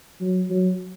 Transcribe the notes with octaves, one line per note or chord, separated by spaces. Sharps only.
F#3
F#3